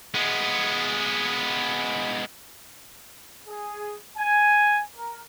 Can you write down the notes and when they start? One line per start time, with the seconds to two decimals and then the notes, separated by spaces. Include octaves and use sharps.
0.15 G#3 B3
3.47 G#4
4.18 G#5
4.95 A#4